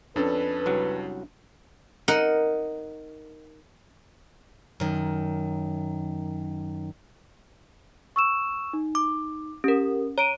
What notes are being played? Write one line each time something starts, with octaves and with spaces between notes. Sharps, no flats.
F2 C#4 D4 A4 B4
C2 F#3 F#5
D#4 A#4 D#5 F#5
F#2 D#3
C#6 E6 E7
D#4
D6
C#4 G4 A#4
C#5 A#5 D7 D#7